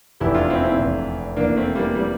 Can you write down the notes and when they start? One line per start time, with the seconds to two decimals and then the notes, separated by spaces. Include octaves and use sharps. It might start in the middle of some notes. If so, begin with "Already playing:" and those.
0.20 F1 E2 E3 E4 G4
0.35 D4 F4
0.50 C4 E4
0.64 C4 E4
0.78 F1 E2 E3
1.37 F1 E2 E3 A#3 D4
1.57 A3 C4
1.75 G3 A#3
1.95 E3 G3